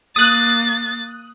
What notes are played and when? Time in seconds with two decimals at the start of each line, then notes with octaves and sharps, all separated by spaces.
0.16 A#3 D#6 F#6 A6